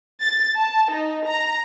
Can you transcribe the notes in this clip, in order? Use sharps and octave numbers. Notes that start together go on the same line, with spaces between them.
A6
A5
D#4
A#5